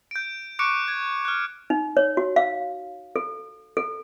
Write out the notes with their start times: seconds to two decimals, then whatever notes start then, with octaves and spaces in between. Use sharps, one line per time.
0.11 G6 D7
0.59 C#6 D6 F#6 C#7 D7
0.88 G#6
1.25 F6 F#6
1.70 D#4
1.97 C#5
2.17 F#4
2.36 F5
3.16 A4
3.77 A4